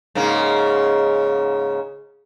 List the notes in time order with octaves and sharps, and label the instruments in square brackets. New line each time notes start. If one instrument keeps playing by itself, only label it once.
[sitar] G#2 C#3 A#3